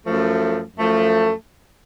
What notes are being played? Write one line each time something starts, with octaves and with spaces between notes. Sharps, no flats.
F#2 F3 A3
F#2 F3 A3